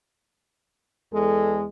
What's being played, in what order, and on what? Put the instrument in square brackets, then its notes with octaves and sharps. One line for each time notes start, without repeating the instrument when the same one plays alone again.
[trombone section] E2 G#3 [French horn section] A4